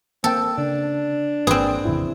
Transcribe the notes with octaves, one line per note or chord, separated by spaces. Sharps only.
A#3 C4 A4 G5
C#3 D4
G#1 A#3 C4 G#4 B4 D5
A1 F2 C#3 E4